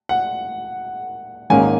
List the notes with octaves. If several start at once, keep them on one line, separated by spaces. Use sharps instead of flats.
F#5
G#1 G#2 D#3 A#3 C#4 G#5